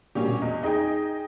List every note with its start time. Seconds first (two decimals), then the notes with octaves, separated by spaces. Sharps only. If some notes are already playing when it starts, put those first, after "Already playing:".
0.15 A#1 B2 G3 A#3 C#4 G4
0.42 E2 D#5
0.63 D#4 G#4 D#5 G5